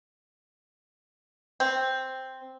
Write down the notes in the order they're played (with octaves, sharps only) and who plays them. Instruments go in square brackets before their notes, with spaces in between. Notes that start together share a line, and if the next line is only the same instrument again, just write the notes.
[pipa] C4